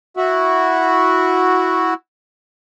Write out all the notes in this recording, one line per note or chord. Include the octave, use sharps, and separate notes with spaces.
E4 F#4